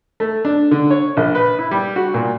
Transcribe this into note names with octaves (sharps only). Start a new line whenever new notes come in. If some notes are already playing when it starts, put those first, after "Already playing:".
A3
D4
D3
C#5
A#1
B4
E4
G3
F#4
A#2